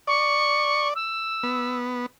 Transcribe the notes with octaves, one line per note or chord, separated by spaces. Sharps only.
D5 C#6
E6
B3